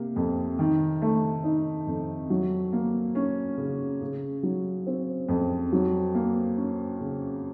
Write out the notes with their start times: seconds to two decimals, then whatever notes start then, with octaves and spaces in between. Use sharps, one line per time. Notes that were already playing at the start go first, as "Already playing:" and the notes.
Already playing: C3 A#3
0.16 F2
0.59 D#3
1.02 A3
1.44 D#4
1.87 F2
2.30 F#3
2.73 A#3
3.15 C#4
3.58 C#3
4.02 C#3
4.43 F#3
4.87 C4
5.29 F2
5.72 F#3
6.15 A#3
6.57 C#4
7.00 C#3